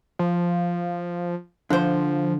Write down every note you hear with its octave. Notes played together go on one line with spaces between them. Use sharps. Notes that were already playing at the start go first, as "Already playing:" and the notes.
F3
D3 F3 C5